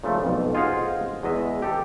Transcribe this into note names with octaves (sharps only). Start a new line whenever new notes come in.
A#2 C#3 F3 A3
B1 F2
F4 G#4 C5 D#5 F5 F#5
E2 G#3 D#5 E5
G4 A4